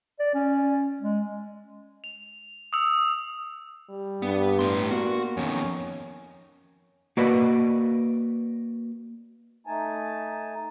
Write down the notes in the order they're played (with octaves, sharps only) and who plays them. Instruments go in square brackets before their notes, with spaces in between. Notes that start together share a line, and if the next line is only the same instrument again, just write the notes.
[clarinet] D5
C#4
G#3
[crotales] F7
D#6 E6
[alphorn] G3
[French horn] G2 [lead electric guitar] B3
[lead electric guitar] A2 C6
[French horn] A#3 [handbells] B3 [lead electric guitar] F#4
[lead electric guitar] F2 D#3 [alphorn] C#4
[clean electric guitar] A#3 F#4 B4 D5 D#5
[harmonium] A3 D#4 G#5 A5